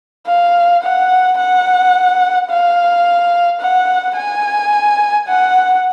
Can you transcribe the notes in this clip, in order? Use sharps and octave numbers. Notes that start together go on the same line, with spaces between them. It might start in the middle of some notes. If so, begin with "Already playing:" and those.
F5
F#5
F#5
F5
F#5
G#5
F#5